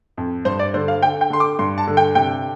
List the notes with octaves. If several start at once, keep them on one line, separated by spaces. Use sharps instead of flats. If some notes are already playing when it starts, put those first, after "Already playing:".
F2
G2 C5
D5
D3 C5
F5
D3 G5
G5
D3 C6
D6
G2 C6
A5
D3
G5
C3 G5